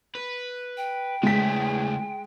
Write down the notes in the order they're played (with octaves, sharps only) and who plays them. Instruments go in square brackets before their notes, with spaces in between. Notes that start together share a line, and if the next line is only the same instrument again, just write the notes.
[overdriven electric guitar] B4
[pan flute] G5
[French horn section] E2 A2 G#4 [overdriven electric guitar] C#3 A3 [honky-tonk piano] G#3 B6